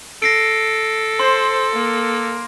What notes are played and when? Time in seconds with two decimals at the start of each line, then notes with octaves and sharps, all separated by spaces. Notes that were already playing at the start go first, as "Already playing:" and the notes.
0.22 A4 A#6 C7 D7
1.20 C5 C6
1.73 A#3